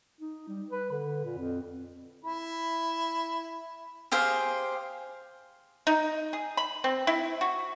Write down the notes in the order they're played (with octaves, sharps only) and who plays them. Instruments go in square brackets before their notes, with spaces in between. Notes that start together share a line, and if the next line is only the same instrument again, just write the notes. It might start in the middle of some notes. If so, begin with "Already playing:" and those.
[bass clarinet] D#4
G3
B4
D3
A#2
F2
[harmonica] E4 B5
[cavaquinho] G4 G#4 C5 F5
[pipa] D#4
G#4
B5
C4
E4
F#4